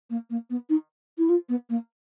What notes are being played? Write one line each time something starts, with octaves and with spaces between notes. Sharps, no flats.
A#3
A#3
B3
D#4
E4
F4
B3
A#3